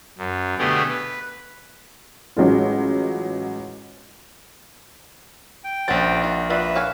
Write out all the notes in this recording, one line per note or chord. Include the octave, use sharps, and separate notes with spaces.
F#2
B2 D3 A3 B3 G4 G#4
B4
A1 F#3 G#3 F4
G5
A#1 G3 C#4 C5 F#5 A6
D#4 F4
F4 B4 D5 E5
C#5 F5 G#5